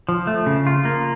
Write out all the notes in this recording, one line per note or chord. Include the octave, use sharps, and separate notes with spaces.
F3
A3
C#3
F4
A#3